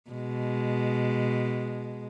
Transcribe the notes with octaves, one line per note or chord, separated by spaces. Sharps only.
B2 G#3